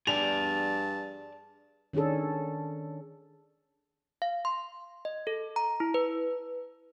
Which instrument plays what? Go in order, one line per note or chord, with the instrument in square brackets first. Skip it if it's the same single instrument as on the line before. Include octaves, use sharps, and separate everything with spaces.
[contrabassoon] G2 [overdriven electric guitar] G#4 D5 [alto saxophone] A5 [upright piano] F7
[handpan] D#3 C#4 D4 G#4 A4
[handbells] F5
C6
D#5
A4
A#5
E4
B4